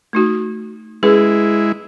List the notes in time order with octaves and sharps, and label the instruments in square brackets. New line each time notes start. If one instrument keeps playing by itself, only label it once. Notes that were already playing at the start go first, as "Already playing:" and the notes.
[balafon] A3 D#4 F#4
[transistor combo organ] G#3 E4 [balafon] C#4 G#4 B4